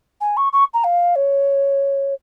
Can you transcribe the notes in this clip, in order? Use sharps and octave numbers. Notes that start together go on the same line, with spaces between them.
G#5
C#6
C#6
A#5
F5
C#5